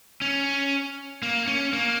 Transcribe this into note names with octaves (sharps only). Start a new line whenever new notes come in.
C#4
A#3
C#4
A#3